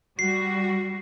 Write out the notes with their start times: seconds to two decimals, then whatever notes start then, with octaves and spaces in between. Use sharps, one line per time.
0.19 G3 F#4 C7